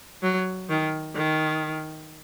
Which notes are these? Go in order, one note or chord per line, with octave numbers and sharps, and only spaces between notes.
F#3
D#3
D#3